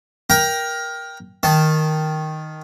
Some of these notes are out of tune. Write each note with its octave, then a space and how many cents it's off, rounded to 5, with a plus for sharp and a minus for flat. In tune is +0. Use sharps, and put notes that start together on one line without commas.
A#4 +15 G5 +0 A#5 +20
D#3 +0 A5 -5